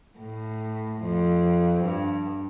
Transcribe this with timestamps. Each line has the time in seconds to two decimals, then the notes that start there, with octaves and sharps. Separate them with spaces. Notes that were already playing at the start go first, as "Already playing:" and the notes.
0.18 A2
1.01 F2
1.84 G2